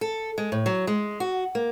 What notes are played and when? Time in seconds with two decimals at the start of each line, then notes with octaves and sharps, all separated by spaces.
0.01 A4
0.38 G#3
0.52 A2
0.66 F#3
0.87 G#3
1.20 F#4
1.55 A#3